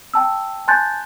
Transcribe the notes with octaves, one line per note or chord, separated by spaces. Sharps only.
G5 A5 E6
G#5 A5 C6 F#6 G6 A6